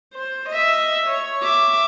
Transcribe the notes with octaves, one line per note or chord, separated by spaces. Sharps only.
C5
D#5 E5
C#5
E5 D6